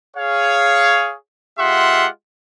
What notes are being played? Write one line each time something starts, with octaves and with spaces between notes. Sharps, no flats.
G#4 C#5 F5
G#3 F4 G4 E5 F#5 C6